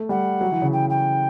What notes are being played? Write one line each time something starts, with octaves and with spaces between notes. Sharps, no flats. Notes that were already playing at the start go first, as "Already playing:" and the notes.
Already playing: A3
G3 F#5
F#3
E3
C#3
G5
G5